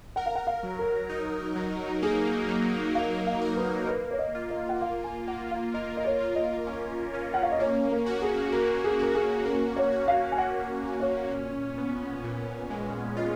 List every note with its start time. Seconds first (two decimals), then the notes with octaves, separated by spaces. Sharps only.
0.16 A#4 F#5
0.26 F5
0.35 F#5
0.47 F5
0.63 F#3
0.79 A#4
1.09 D#4
1.56 F#3
2.02 A#3 G#4
2.49 F#3
2.95 A#4 F5
3.27 F5
3.41 A#4
3.57 B4
3.88 A#3 B4
4.11 C#5
4.18 D#5
4.35 F4
4.50 D#5
4.69 F#5
4.81 A#3 F5
5.04 G#5
5.27 A#3 F#5
5.51 F5
5.74 A#4 D#5
5.97 D#5
6.05 C#5
6.20 F4
6.35 D#5
6.67 C#4
7.13 C#4
7.34 F#5
7.43 F5
7.52 D#5
7.59 A#3 C#5
7.91 A#4
8.06 F#4
8.22 G#4
8.52 A#3 A#4
8.84 G#4
8.99 F#4 A#4
9.14 G#4
9.45 A#3 A#4
9.76 C#5
9.92 F#4
10.08 F5
10.32 G#5
10.38 F#4 F#5
10.85 C#4
11.00 C#5
11.31 A#2
11.78 B3
12.24 A#2
12.70 G#3
13.17 F4 D#5